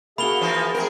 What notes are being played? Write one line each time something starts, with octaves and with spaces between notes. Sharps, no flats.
A#3 F#4 G#4 E5 A5 B5 F7 G7
E3 F3 D#4
A3 C4 G#4 A#4